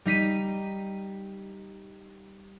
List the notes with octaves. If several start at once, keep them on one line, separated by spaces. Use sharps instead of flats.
G3 D#4 B6 D#7